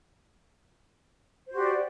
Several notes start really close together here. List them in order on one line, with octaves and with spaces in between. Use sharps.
C5 F#4 G4 D5